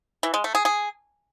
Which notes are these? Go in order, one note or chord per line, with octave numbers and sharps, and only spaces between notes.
E3
G#3
A3
G#4
G#4